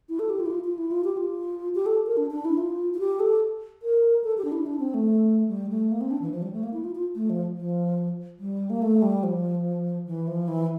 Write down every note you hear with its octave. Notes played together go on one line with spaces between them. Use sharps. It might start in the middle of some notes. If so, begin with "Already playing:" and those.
E4
A4
G4
F4
E4
F4
F4
E4
F4
G4
F4
G4
A4
A#4
D4
D4
E4
F4
F4
G4
A4
A#4
A4
G4
D4
E4
D4
C4
A3
G3
A3
A#3
C4
D4
E3
F3
G3
A3
A#3
E4
F4
F4
A3
F3
F3
G3
A#3
A3
G3
F3
E3
F3
E3